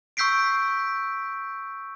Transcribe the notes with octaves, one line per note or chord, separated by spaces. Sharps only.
C#6 E6 G6 B6 C7 D7